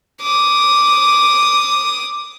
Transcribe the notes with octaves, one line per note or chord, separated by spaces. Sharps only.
D6 D#6